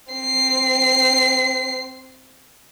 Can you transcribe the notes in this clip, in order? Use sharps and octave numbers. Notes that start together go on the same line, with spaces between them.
C4 C7